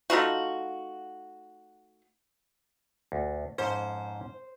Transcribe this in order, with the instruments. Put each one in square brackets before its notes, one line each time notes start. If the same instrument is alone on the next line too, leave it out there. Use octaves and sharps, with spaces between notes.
[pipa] A3 D#4 F4 F#4
[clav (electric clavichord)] D2
[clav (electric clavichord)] F2 G#2 C#4 [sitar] C5